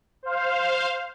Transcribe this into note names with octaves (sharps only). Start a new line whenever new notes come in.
C5 F5